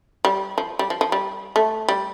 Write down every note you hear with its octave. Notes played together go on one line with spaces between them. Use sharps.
G3
F3
G3
F3
F3
G3
A3
G3